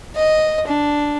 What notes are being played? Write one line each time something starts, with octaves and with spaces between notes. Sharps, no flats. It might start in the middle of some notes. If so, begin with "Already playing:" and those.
D#5
D4